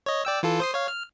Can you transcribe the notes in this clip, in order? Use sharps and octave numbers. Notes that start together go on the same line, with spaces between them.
C#5 D#5
D5 G5 E6
E3 F4 A4
C5 D#6 C7
C#5 F5
F6